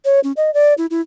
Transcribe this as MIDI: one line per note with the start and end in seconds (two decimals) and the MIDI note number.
0.05 0.20 73
0.24 0.32 61
0.37 0.53 75
0.54 0.74 74
0.78 0.86 64
0.91 1.01 64